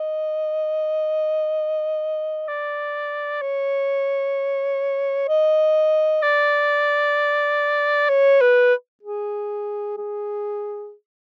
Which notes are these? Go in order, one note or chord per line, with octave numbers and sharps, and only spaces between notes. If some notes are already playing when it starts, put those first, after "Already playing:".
Already playing: D#5
D5
C#5
D#5
D5
C#5
B4
G#4
G#4